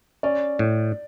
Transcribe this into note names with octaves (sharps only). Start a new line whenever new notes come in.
C#4 D5
A2